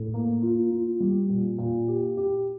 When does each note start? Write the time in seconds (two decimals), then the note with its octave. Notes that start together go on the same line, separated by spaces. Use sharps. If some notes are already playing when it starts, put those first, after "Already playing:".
Already playing: A2
0.14 A#3
0.42 F4
0.71 F4
1.00 G3
1.30 A#2
1.58 A#2
1.88 G4
2.17 G4